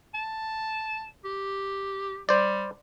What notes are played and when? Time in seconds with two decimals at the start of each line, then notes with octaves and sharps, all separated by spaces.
0.14 A5
1.25 G4
2.29 G3 C5 D5